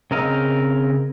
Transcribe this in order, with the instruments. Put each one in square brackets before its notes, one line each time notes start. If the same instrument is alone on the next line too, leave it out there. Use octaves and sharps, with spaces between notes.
[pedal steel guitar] C#3 C4 A#4 D#5 F5